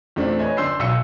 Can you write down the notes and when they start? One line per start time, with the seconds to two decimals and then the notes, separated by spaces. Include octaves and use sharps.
0.16 E2 A#2 A3 C4 D4
0.39 B4 C#5 D#5 G#5
0.57 G1 D4 C6 E6 G6 C7
0.79 B1 B2 E6 C#7